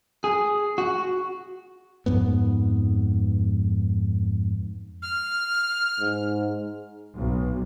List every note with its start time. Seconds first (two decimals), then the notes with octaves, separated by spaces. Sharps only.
0.24 G#4
0.78 F#4
2.06 F2 G#2 B3
5.02 F6
6.00 G#2
7.15 B1